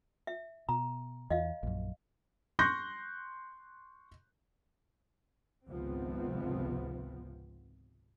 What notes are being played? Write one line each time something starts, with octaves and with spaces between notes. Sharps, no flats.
E5
B2 A#5
E2 D#5 F5
A#1 F#2
C6 C#6 F#6 G6 A#6
G#1 C#2 C3 F3 B3 C4